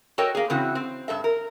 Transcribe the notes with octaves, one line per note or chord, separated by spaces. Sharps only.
F#4 A4 A#4 C#5 D#5 G5
A#3 G#4
C#3 E3 C4 E4 F#4
C4
G2 A4 E5
A#4